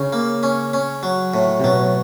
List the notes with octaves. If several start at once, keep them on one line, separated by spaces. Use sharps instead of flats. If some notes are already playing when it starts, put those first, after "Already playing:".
Already playing: C#3 C#4
A#3
C#4
C#4
F#3
A2
C3
B2 F#3